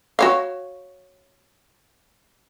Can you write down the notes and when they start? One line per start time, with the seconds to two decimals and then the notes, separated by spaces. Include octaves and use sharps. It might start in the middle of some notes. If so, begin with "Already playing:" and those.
0.19 F#4 C#5 F5